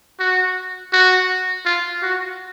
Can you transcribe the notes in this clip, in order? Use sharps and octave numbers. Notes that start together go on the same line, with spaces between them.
F#4
F#4
F4
F#4